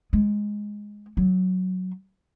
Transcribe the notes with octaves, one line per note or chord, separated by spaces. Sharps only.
G#3
F#3